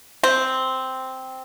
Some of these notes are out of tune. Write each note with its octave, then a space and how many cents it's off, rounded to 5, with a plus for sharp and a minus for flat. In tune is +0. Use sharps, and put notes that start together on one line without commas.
C4 -5